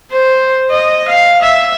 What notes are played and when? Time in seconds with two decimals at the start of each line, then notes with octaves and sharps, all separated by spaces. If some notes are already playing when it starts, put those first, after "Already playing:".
0.12 C5
0.71 D#5
1.09 F5
1.42 E5